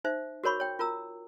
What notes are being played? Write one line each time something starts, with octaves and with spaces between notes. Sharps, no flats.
D#4 C5 E5
F#4 A#4 C#5 B5 C#6
C#5 G5
F4 A#4 A#5 E6